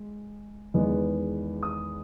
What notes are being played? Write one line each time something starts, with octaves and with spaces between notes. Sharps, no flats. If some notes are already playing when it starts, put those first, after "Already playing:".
Already playing: G#3
E2 D#3 G#3 B3
D#6